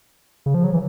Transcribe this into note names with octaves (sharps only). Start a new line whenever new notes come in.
C#3
F3
F#3
E3